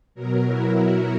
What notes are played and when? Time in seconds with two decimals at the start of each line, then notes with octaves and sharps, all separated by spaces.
0.15 B2 F#3 A#4
0.45 E4
0.75 F#4